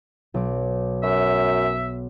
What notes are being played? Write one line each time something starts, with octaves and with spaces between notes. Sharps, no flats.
B1 D6
F#2 E5